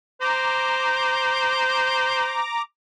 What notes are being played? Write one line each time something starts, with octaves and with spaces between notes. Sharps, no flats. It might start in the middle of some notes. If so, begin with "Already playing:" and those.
C5 A#5 D6